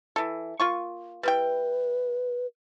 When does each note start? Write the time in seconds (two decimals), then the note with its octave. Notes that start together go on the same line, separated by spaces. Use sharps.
0.16 E3 A4
0.60 A#3 F4 C#6
1.23 G3 E4 B4 G5